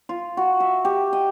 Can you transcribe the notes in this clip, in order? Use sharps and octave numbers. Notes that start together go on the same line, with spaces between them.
F4
F#4
E5
G4
D#5